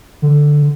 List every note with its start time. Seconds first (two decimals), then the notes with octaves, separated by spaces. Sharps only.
0.22 D3